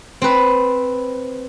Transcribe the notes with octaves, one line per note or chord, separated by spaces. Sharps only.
C4 B4